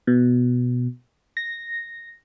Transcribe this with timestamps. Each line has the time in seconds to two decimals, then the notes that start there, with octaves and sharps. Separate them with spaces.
0.07 B2
1.37 A#6